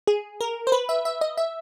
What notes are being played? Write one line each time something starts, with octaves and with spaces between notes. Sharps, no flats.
G#4
A#4
C5
B4
E5
E5
D#5
E5